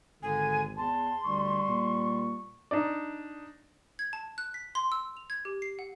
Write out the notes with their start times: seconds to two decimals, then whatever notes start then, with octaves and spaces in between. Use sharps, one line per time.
0.23 G#1 D3 G#5
0.77 E2 A5 C6
1.26 D2 G3 C#6
1.68 A#2
2.71 D4 D#4 D5
3.99 G#6
4.13 A5
4.38 F#6
4.54 B6
4.75 C6
4.92 E6
5.17 F7
5.30 G#6
5.45 G4
5.62 C7
5.79 F#5